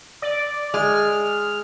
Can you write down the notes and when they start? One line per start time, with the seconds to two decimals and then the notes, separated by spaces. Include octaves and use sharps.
0.22 D5
0.74 G#3 F6